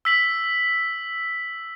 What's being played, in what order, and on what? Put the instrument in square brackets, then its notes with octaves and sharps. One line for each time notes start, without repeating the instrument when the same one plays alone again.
[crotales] E6 B6 F#7